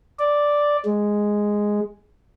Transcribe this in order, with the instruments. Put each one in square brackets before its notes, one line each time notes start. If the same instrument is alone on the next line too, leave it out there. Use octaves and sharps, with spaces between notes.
[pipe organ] D5
G#3